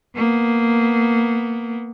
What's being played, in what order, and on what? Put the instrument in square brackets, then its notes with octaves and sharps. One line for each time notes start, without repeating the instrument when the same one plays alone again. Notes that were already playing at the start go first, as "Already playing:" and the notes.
[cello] A#3 B3